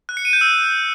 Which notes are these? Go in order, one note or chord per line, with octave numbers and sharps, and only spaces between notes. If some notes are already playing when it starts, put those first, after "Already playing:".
F#6
C#7
D#7
G6
E6